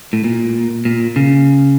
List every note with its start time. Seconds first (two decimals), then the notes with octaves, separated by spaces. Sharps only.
0.13 A2
0.24 A#2
0.85 A#2
1.16 C#3